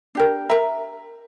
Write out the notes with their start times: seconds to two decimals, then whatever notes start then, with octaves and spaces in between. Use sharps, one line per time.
0.15 D4 G4 A#4
0.49 A#4 E5 A#5